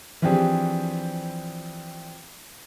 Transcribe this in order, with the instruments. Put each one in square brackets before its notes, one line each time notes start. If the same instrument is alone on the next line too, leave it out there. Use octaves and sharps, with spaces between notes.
[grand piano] E3 F3 C4 D4 G4 G#4